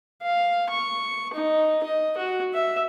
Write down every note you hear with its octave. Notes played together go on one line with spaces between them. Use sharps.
F5
C#6
D#4
D#5
F#4
E5